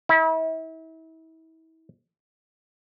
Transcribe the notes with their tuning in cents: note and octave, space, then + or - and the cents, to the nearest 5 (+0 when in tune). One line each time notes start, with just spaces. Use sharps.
E4 -35